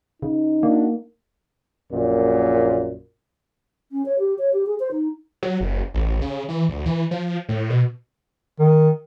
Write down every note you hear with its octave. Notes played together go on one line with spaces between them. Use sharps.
C#3 D#4
A#3 D4 F#4
A#1 F#2 A#2
C#4
C#5
G4
C#5
G4
G#4
C5
D#4
F#3
F#1
A1
C#3
E3
D2
E3
F3
A2
B2
D#3